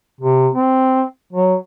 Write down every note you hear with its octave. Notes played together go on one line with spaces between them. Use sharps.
C3
C4
F#3